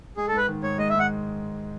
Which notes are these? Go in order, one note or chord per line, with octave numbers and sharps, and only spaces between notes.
G#3 G#4
A4
G#2
B4
D#3
G#2 C#5
G#3 D#5
E5
G#2 F#5